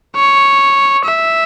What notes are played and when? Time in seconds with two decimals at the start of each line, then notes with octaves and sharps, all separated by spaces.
0.16 C#5
1.05 E5